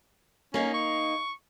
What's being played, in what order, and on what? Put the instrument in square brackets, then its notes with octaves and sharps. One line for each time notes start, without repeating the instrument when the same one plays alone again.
[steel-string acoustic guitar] A#3 D#4 [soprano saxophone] C#4
[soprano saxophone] C#6